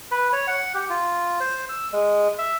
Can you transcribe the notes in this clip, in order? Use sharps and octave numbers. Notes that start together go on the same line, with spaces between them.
B4
C#5
F#5
G4
F4
C5
E6
G#3
E5